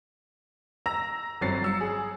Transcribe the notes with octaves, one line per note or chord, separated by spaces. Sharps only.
A#5 E6 A#6
G1 F#3 C4 A6 C7
F#3 E6 C#7
G#4